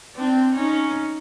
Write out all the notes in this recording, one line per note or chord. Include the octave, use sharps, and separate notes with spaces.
C4 D4
C#4 D#4